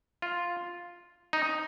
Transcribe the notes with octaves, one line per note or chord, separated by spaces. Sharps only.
F4
D#4